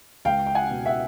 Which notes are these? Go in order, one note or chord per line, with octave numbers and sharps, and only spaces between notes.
C#2 F5 G5
G5
F#5 G#5
B2
E5 F#5